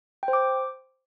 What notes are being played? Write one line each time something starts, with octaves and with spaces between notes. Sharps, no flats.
G5
C5
D6